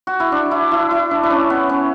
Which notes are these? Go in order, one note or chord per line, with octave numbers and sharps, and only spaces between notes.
F#4
E4
D4
E4
E4
E4
D4
D4
C#4
B3
C#4